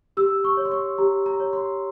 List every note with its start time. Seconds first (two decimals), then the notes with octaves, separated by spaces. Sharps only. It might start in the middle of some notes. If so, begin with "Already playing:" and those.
0.17 G4 E6
0.45 C#6
0.57 C#5
0.65 C6
0.72 C#6
0.98 G4 A#5
1.26 A#5
1.40 C#5
1.53 C6